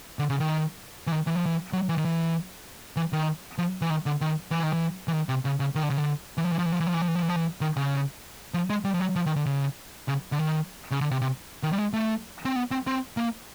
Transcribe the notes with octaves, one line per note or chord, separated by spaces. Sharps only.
D3
C#3
D#3
E3
D#3
E3
F3
E3
F#3
E3
D#3
E3
E3
D#3
F3
E3
D#3
D3
D#3
E3
D#3
E3
E3
D#3
C3
C#3
C#3
D#3
D3
C#3
D3
E3
F3
E3
F3
E3
F3
E3
F3
E3
F3
E3
F3
E3
F3
E3
D#3
C#3
F3
G#3
G3
F3
F#3
F3
D#3
D3
C#3
C#3
D3
D#3
C#3
D3
C3
C3
D#3
G3
G#3
A3
C4
B3
C4
C4
A#3